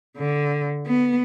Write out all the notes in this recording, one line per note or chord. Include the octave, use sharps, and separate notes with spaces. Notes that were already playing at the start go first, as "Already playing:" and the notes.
D3
B3